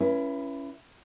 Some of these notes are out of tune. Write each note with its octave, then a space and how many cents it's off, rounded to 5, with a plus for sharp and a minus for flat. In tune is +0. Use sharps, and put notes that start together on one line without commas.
C#4 +0 E4 +25 B4 -30